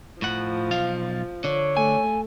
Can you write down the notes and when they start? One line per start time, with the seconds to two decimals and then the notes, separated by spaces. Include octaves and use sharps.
0.22 A2 F3 F#5
0.71 B1 F4 F5
1.44 D3 C#5
1.77 A3 G#5